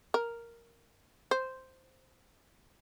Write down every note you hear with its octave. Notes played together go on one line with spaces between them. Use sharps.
A#4
C5